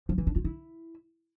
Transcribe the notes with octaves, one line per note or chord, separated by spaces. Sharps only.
F3
E3
D4
F4
E4